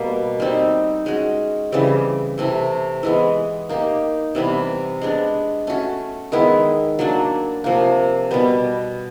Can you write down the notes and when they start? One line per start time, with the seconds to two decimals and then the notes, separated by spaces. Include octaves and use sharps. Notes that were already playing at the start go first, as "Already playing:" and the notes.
Already playing: B2 G3 A#3
0.40 G3 C4 D#4
1.06 G#3 C#4 F#4
1.72 C#3 E3 G3 C4
2.38 C3 E3 A3 C4
3.03 E3 G#3 B3
3.69 A#3 D#4 G4
4.35 C3 E3 G3 B3
5.01 G#3 B3 D4
5.67 A3 C#4 F#4
6.32 D#3 G#3 B3 E4
6.99 F#3 A#3 D4
7.64 C3 F3 A#3
8.31 B2 G3 B3